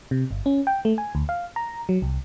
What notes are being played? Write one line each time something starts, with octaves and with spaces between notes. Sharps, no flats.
C3
G1
C#4
G5
A3
G#5
D2
F5
A#5
F#3
C2